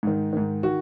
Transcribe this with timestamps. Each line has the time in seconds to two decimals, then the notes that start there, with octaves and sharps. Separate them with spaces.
0.03 G#2 D#3
0.33 G#2 D#3
0.63 D#3 F#4